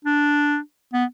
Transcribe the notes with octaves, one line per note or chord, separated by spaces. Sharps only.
D4
B3